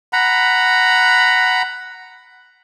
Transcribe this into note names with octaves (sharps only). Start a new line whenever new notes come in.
F#5 A#5 B5